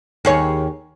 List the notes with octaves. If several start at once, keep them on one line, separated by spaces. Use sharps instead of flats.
D#2 G#4 C#5